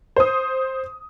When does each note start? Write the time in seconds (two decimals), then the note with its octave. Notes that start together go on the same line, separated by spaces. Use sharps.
0.16 C5 D#6